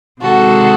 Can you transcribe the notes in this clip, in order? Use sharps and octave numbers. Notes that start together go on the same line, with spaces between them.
C3 D#3 G#3 F#4 A4